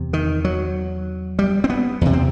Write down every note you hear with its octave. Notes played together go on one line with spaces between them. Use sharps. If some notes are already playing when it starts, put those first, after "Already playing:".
Already playing: E2 C3
D#3
F#3
G3
C4
B3
E2 C3
C4